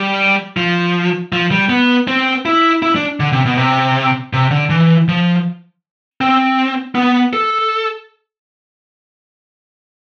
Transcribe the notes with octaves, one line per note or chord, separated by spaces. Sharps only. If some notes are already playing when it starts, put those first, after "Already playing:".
Already playing: G3
F3
F3
G3
B3
C4
E4
E4
D4
D3
C3
B2
C3
C3
D3
E3
F3
C4
B3
A4